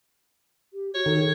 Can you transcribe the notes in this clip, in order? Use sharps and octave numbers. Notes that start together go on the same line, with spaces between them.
G4
F#4 C#5
D#3 A4
G#4